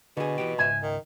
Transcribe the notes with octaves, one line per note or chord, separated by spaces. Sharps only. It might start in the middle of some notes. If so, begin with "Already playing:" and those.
B2 D3 G#4
E3 B3 G4
C#2 G#2 E5 G#5
D#3